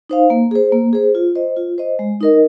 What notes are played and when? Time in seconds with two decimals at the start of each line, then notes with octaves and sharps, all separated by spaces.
0.10 D#4 C5 F5
0.30 A#3
0.51 G#4 C5
0.72 A#3
0.93 G#4 C5
1.15 F4
1.36 C5 D#5
1.57 F4
1.78 C5 D#5
1.99 G#3
2.21 D#4 A#4 D#5